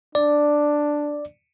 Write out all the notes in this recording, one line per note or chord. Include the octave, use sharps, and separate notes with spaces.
D4 D5